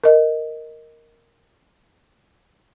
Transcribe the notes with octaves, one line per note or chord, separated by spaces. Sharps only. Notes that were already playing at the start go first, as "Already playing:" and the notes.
A#4 D#5